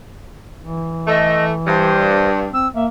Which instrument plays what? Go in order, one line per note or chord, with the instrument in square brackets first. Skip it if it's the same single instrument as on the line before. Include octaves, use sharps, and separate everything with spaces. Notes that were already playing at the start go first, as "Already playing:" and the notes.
[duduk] E3
[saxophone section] A3 [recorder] D#5
[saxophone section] G2 [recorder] C5
[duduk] C4 [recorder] E6
[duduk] A#3 [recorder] E5